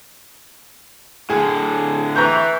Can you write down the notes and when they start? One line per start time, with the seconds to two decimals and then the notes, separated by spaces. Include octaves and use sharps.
1.30 A2 D3 G#4
2.16 E3 A#5 C#6 G6